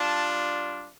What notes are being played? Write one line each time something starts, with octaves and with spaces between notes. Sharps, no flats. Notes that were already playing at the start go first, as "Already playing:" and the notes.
Already playing: G3 D4 F4 A5